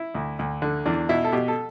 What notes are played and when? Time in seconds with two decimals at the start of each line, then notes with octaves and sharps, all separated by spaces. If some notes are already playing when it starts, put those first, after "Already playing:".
Already playing: E4
0.15 D2
0.39 D2
0.62 D3
0.86 E2 D4
1.09 B2 E4
1.24 A4
1.32 B2 G4
1.48 A4